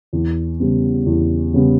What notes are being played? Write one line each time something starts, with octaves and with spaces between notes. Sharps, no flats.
E2
C#3 G3 B3
E2
C#3 G3 B3